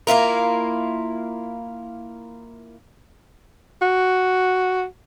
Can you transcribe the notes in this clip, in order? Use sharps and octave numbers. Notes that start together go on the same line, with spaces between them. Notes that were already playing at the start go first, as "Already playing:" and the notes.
A#3 E4 F4 A#4
F#4